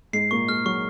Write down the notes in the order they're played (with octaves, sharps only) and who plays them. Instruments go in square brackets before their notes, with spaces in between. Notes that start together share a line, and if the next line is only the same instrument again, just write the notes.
[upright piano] G#2 G#3 [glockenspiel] C7
[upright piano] A#2 A#3 [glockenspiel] C#6
[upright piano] G#3 G#4 [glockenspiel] F6
[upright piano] F#3 F#4 [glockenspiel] C#6